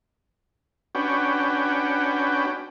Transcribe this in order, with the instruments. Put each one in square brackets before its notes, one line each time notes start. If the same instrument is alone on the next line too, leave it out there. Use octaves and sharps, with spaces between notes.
[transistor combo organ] C#4 D4 F#4 B4 G5